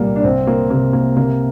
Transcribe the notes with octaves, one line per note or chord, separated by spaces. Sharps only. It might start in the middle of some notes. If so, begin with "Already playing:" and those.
Already playing: C2 A#2 G3 A#3
D4
C2 C4
A#3
C3 A#3
A#3
C3 A#3